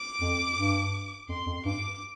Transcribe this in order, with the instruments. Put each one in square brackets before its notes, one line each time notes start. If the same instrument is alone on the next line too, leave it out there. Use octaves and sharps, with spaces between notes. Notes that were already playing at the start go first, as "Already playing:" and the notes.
Already playing: [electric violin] D6
[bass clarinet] F2
G2
[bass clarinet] F2 [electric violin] C6
[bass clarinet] F2
[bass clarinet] G2 [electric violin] D6